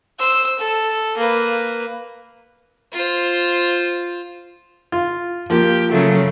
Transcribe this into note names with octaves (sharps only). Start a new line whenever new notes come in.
C5 E6
A4
A#3 B4
F4 C5
F4
F3 A#3 G4
C#3 F#3 A3